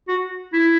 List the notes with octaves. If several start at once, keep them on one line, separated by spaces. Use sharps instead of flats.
F#4
E4